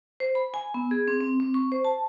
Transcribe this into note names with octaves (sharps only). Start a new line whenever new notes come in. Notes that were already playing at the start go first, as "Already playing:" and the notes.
C5
B5
G#5
B3
G#4
C4
C4
C4
C#6
C5
A5